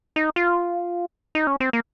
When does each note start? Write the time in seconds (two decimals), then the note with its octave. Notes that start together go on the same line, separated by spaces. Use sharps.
0.16 D#4
0.36 F4
1.35 D#4
1.47 C#4
1.60 C4
1.73 A#3